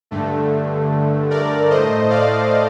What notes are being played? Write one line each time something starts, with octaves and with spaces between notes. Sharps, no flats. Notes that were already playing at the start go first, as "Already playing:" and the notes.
G2 D3 A3
A#4 D5
A2 A3 C5 D#5
D5 F5